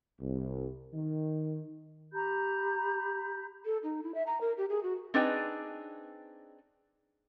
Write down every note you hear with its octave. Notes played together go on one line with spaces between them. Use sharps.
C2
D#3
G4 A#5 B5 G6
A4
D#4
E4
E5
A#5
A#4
G4
G#4
F#4
C4 D4 D#4 G#4 B4 G5